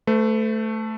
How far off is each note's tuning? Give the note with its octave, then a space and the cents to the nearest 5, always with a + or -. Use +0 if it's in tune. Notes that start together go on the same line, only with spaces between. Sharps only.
A3 +0 B4 +45